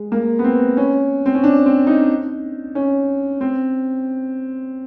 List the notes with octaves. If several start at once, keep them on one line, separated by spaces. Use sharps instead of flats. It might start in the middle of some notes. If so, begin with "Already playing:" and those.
Already playing: G#3
A#3
B3
C4
C#4
C4
C#4
D4
C4
D#4
C#4
C4